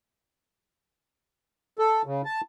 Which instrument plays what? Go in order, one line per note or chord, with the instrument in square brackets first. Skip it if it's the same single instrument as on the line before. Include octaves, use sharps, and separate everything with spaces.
[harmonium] A4
C#3
A5